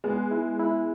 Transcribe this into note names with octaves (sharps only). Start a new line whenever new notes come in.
G#3 B3
E4
E4